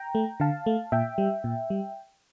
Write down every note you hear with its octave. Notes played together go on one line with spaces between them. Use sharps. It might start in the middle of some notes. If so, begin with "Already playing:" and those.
Already playing: G5 A#5
A3
D3 F5 A5
A3
A#2 E5 G5
G3
A#2
G3